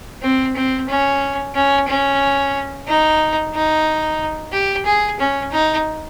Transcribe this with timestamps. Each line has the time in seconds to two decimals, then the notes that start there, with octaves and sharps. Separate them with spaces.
0.22 C4
0.56 C4
0.89 C#4
1.55 C#4
1.88 C#4
2.88 D#4
3.54 D#4
4.52 G4
4.86 G#4
5.20 C#4
5.52 D#4